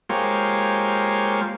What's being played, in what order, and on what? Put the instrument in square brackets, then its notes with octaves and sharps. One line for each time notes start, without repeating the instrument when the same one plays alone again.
[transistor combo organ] G#3 A#3 F4 G4 C5 C#5